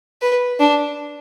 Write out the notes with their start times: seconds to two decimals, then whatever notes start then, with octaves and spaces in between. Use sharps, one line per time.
0.22 B4
0.60 D4